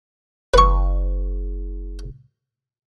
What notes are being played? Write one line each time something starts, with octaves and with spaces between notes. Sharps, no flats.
F#1 B4 C#6